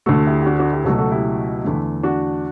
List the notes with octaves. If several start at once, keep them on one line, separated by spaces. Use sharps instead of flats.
D2 D3 A3 F#4 A4
E4 G4
G4
D4 F#4
D4 F#4
E4 G4
C#2 B2 F#3 A3 F#4 A4
F#4 A4
E4 G4
E2 D3 A3
D4 F#4